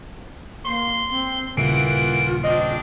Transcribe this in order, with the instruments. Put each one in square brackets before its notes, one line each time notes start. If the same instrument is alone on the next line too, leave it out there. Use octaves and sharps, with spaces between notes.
[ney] A#3 [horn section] C6
[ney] C4
[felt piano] D#1 C#3 C7 [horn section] E3 A#3 F#5 [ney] F4 [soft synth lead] D7
[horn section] G#3 C4 D4 [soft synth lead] D#5